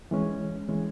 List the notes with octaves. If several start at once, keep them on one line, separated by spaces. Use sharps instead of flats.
E3 G#3 C#4
E3 G#3 C#4